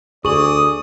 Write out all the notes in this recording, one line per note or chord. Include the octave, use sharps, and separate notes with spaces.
D2 G#4 D5 C#6 D#6 F#7